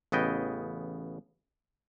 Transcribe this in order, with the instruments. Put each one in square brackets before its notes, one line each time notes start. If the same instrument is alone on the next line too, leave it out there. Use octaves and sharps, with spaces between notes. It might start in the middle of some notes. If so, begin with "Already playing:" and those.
[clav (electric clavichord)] A1 C#3 B3 D#5 G5